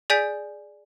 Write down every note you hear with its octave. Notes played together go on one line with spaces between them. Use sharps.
G#4 D5 G#5 G6 B6 D7